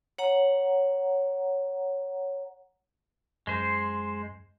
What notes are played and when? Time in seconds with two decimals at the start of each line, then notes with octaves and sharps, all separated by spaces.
0.18 C#5 F#5 A#5
3.47 F#2 G#3 C5